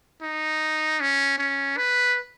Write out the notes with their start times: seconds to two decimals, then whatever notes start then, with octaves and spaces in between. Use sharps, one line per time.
0.22 D#4
1.00 C#4
1.38 C#4
1.77 B4